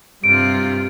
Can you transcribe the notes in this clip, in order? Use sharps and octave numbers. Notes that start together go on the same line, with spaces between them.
G2 C3 F4 D7